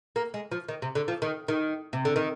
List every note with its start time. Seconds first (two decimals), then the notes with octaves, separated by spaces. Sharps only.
0.16 A#3
0.34 G#3
0.52 F3
0.68 D#3
0.82 C3
0.95 D3
1.08 F3
1.22 D#3
1.48 D#3
1.93 C3
2.05 D3
2.16 D#3